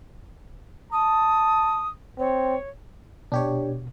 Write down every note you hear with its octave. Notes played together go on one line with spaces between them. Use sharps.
A5 D#6
C4 C#5
B2 D4 G4 C#5